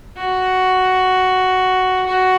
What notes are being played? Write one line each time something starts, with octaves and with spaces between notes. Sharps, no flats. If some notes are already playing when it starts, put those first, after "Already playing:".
F#4
F#4